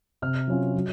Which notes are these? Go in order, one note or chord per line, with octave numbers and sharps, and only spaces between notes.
C3 F6
F#3 C#4 F4
F#3